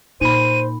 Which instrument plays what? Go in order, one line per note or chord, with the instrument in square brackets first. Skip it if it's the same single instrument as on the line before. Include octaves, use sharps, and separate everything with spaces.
[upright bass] A#2 [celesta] D#4 B5 [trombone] C5 [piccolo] D#7